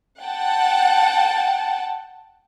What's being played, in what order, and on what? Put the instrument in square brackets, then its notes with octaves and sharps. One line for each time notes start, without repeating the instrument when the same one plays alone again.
[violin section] F#5 G5 A5